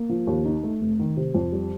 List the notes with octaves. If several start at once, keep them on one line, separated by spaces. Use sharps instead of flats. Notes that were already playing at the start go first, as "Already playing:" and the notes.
Already playing: A#3
F3
D#2
D#4
A3
F1
D#3
C3
F2
G3